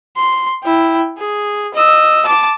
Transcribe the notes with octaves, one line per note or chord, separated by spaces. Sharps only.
C6
E4 G5
G#4
D#5 E6
A5 D6